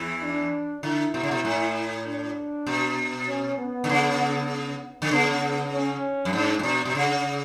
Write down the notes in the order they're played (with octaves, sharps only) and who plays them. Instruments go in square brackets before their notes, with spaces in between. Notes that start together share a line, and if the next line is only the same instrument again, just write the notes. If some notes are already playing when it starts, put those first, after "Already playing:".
Already playing: [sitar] E2 E3
[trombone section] D4
[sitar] D3 [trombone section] E4
[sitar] B2
C#3
B2
A2
[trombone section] D4
[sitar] B2
[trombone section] C#4
B3
[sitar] D3
C#3
D3
[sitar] C#3 [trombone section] B3
[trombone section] C#4
[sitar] F#2
[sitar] G#2 [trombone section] D4
[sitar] A2
[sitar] B2 [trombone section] D4
[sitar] B2
C#3